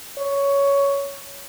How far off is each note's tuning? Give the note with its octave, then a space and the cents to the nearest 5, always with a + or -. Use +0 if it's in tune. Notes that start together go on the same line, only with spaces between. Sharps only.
C#5 +10